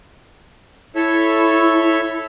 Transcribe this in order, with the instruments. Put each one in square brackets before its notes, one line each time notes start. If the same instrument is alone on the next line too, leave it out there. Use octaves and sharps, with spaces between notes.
[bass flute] E4 [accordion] A4 C#5 E5